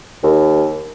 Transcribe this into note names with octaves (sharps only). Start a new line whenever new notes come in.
D#2